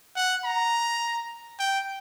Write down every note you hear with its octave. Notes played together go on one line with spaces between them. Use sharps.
F#5
A#5
G5